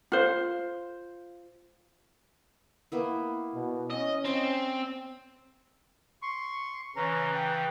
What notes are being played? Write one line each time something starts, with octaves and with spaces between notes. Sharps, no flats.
F4 C5
A#3 B3 E4
B2
C#4 D#5
C4 D5 F5 A5
C6 C#6
C#3 E3 C#4 A#5
G5